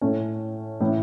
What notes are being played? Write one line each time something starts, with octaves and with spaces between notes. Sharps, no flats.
A2 A3 C#4
A2 E3 C#4 E4